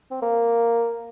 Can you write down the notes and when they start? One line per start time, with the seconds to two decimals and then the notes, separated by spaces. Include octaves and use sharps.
0.11 C4
0.22 A#3